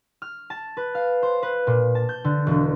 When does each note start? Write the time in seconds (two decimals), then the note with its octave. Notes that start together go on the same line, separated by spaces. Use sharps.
0.22 F6
0.50 A5
0.77 B4
0.95 F5
1.23 C5
1.43 B4
1.67 A#2
1.95 A5
2.09 G6
2.24 D3
2.47 E1